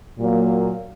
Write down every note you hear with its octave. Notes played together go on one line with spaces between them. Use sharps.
A#2 F#3 A#3